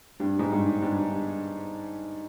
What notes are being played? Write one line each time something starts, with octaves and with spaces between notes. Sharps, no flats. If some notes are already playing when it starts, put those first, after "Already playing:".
G2
G#2
G2
G2